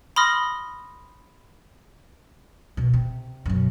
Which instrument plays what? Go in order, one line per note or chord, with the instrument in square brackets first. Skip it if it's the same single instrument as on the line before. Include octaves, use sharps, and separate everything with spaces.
[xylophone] B5 C6 D#6 F6 A#6
[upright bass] B2 D#3
C3
F#2 B2